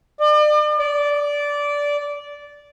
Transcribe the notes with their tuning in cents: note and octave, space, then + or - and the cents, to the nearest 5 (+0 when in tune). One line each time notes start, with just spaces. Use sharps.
D5 +40
D5 -15